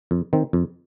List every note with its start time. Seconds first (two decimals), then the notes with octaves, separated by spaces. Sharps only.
0.11 F2
0.33 D#3 C4
0.53 F2